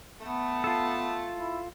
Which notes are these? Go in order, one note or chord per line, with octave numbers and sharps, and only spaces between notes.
A3 B3 A5
F4 A4
E4